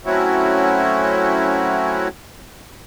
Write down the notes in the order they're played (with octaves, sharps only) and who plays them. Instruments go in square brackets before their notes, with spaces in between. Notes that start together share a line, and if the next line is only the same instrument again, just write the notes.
[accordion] F#3 A3 C4 C#4 E4 F#4